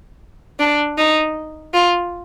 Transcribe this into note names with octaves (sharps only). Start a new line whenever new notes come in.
D4
D#4
F4